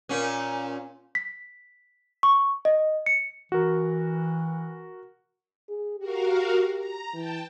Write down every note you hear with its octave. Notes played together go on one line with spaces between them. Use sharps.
A#2 C#4
B6
C#6
D#5
C#7
E3 F#4 A#4
G#4
F#4 G4 A#4 F5
A#5
E3 G5 A5